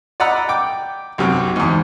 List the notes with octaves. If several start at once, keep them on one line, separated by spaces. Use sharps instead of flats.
D5 D#5 F#5 A#5 B5 E6
G5 D6
B1 F#2 C3 F#3
E2 G#2